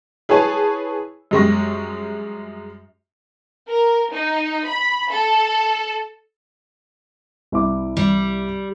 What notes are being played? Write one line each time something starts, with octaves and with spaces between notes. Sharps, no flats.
E4 G#4 B4 C#5 G#5 A5
F#2 G3 G#3 G4 C#6 A#6
A#4
D#4
B5
A4
C2 E4 D6
G3